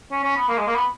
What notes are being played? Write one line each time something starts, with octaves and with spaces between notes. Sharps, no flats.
C#4
C#4
B3
A#3
G#3
A#3
B3